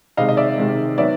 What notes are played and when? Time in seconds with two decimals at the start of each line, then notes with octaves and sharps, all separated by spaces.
0.17 C3 D#3 G#3 D#5 F5
0.29 D#5
0.37 D5 E5
0.58 C3 D#3 G#3
0.98 D#3 F#3 B3 D5 E5